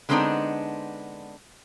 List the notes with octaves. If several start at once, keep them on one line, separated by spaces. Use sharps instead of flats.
D3 G#3 B3 C4 D4 D#4